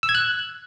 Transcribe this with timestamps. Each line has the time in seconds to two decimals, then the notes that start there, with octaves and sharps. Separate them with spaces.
0.03 E6
0.09 G#6
0.15 F#6